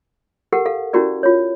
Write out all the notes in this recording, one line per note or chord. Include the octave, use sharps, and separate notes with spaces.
G4 A4 A#4 F#5
A4 F5
C#4 E4 F#4 G4 A#4 D5
F4 C#5